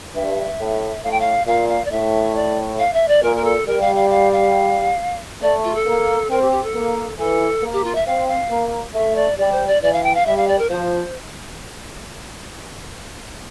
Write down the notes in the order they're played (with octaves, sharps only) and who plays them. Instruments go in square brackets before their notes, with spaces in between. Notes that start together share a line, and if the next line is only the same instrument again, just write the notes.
[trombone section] G2 [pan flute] E5
[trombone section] A2
[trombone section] A2 [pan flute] F5
[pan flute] G5
F5
[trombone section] A#2 [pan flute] F5
[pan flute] F5
D5
[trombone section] A2 [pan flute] E5
[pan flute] D5
F5
E5
D5
[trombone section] A#2 [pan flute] A#4
[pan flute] A#4
A4
[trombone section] G3 [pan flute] A#4
[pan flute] F5
F5
F5
F5
[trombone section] A3 [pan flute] D5
[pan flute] F4
A4
[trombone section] A#3
[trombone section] C4 [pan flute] A#4
[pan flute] G4
G4
A4
[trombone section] A#3
[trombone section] E3 [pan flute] A4
[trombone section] A#3
[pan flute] G4
F4
E5
[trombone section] C4 [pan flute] F5
[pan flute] F5
[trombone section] A#3
[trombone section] A3 [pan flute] E5
[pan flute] D5
[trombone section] G3 [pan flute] D5
[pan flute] C5
D5
[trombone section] E3 [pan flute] D5
[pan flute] F5
G5
F5
[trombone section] G3 [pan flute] E5
[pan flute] F5
D5
A#4
[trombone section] F3 [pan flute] C5